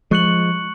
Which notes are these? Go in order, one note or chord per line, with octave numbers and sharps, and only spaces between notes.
F3 G#3 C#6 F#6 C#7 F#7